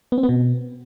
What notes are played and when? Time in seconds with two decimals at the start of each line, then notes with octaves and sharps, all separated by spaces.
0.12 B3
0.18 C4
0.23 B3
0.29 B2